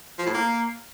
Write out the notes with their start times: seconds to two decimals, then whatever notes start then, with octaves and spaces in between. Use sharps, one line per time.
0.19 F3
0.26 A2
0.34 A#3